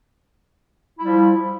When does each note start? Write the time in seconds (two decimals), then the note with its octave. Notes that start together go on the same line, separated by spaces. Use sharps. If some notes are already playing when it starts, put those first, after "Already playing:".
0.99 E4
1.03 G3
1.07 F3